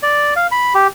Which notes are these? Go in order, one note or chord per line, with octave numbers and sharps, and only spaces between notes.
D5
F5
B5
G4